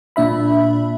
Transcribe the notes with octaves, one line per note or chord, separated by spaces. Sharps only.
A#2 D4 E5 B5